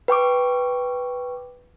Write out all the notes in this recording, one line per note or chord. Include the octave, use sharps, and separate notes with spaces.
B4 G5 C#6 D6